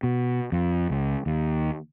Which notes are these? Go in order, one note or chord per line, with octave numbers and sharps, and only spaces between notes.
B2
F2
C#2
D#2